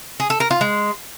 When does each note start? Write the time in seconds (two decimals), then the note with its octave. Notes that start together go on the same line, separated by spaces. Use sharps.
0.20 G#4
0.30 A4
0.40 A#4
0.51 F4
0.61 G#3